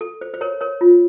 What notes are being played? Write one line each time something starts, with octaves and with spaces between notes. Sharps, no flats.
A4
C5
C5
A#4 C#5
A#4 C#5
F4